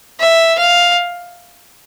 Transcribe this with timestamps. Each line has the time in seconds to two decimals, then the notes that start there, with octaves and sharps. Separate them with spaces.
0.20 E5
0.58 F5